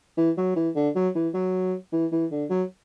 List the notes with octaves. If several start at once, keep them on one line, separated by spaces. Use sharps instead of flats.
E3
F#3
E3
D3
F#3
E3
F#3
E3
E3
D3
F#3